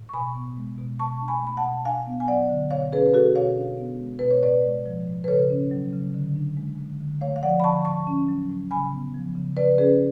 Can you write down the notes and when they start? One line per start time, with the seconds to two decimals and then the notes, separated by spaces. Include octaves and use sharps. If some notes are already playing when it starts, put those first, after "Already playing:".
Already playing: A2
0.09 C#6
0.14 B2 G#5 B5
0.35 B3
0.57 G#3
0.79 B2
0.99 B2 A5 C#6
1.21 D4
1.28 G#5 B5
1.43 A3 B5
1.57 F#5 A5
1.64 B2
1.85 D4 F5 G#5
2.07 B3
2.20 G#5
2.28 F#3 D5 F#5
2.50 D3
2.71 B2 C#5 F5
2.93 C#4 G#4 B4
3.06 B4
3.14 A3 F#4 A4
3.35 B2 C#5 F5
3.57 D4
3.78 B3
4.00 G#3
4.19 B2 B4
4.31 C#5
4.43 A2 B4 D5
4.64 G#3
4.86 F3
5.07 A2
5.24 B4
5.28 C#3 A4 C#5
5.50 C#4
5.71 F#3
5.93 C#3
6.14 D3
6.36 D4
6.57 G#3
6.78 D3
7.00 D3
7.21 A3 C#5 F5
7.36 F5
7.43 F3 D5 F#5
7.60 B5
7.64 D3 A5 C#6
7.85 A2 A5 C#6
8.07 C#4
8.28 F#3
8.50 A2
8.71 C#3 G#5 B5
8.93 B3
9.14 F3
9.35 C#3
9.57 C#3 B4 D5
9.78 C#4 G#4 B4